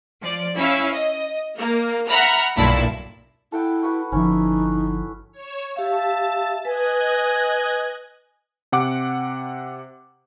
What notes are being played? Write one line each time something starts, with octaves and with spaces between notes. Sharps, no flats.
F3 D5
C#4 E4 E5 F5
D#5
A#3
E5 F#5 A#5 B5 F6
B1 G2 A#2 E4 A5
E4 A4 F#5 G5
F#4 B4 F#5
G1 D3 F3 C#4 D#4 E4
C#5 E7
G4 E5 F5 A5
B4 D#5 G#5 F#6 G#6
C3 F#5 D6